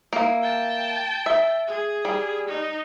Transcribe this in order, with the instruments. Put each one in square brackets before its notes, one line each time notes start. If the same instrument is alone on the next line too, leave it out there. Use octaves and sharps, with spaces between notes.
[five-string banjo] A#3 E4
[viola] G5 A5
[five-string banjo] E5
[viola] G#4
[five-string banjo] G3
[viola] D#4